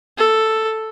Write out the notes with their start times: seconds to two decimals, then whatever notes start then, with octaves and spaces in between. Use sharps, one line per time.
0.17 A4